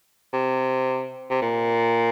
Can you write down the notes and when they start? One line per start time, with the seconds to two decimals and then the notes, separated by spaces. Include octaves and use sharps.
0.33 C3
1.30 C3
1.42 A#2